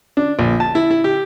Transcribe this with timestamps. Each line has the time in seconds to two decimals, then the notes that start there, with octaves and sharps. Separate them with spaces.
0.17 D4
0.39 A#1
0.60 A5
0.75 E4
0.91 E4
1.04 G4